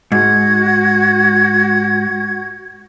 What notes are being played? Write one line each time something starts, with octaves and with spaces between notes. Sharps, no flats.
G#2 F#4 F#5 G#6